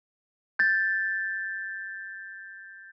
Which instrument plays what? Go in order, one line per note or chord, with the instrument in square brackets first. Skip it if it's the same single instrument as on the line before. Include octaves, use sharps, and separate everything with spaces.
[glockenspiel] G6 A6